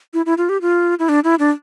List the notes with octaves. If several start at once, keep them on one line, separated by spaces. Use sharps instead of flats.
E4
E4
F4
G4
F4
E4
D4
E4
D4